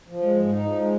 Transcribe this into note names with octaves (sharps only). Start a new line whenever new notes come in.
F3
G#3
G#2
D#4
F3
G#3